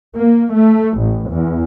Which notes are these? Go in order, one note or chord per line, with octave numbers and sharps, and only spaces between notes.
A#3
A3
A1
E2